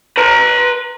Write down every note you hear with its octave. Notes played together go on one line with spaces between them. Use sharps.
B4 A#5